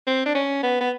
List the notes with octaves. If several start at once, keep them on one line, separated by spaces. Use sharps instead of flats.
C4
D4
C#4
B3
B3